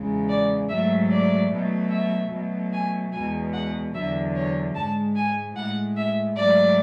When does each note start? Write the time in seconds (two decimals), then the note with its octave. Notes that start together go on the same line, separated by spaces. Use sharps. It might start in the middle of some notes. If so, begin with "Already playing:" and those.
Already playing: E2 C#3 G#3
0.29 D5
0.69 G#2 F#3 A3 E5
1.10 D5
1.50 B2 F#3 A3
1.91 E5
2.31 B2 F#3 A3
2.73 G#5
3.12 E2 B2 G#3 G#5
3.53 F#5
3.94 E2 D3 F#3 E5
4.35 C#5
4.75 G#2 G#3 A5
5.16 G#5
5.56 A2 G#3 F#5
5.97 E5
6.37 G#2 F#3 A3 D5